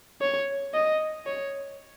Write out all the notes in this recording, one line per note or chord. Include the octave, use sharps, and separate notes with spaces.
C#5
D#5
C#5